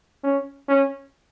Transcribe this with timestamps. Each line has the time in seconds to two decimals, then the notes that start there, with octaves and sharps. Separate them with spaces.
0.24 C#4
0.68 C#4